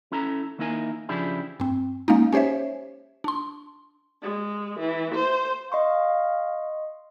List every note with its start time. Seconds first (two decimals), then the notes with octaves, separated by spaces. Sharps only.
0.12 C#4 E4 A4 A#5
0.58 D#3 A#3 D#4 E4 A#4 G#5
1.09 C#3 F3 D4 E4 G4 G#4
1.60 G2 C4
2.08 G#3 A#3 C#4 D#4
2.33 C#4 G4 C5 C#5 E5
3.24 D4 C6
4.22 G#3
4.79 E3
5.14 C5
5.72 D#5 F5 C6 C#6